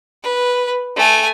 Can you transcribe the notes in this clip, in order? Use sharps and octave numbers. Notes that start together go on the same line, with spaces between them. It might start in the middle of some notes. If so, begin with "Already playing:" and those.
B4
A3 G#5